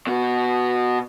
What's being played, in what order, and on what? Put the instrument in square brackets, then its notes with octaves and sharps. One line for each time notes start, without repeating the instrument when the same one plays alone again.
[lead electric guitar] B2 F#4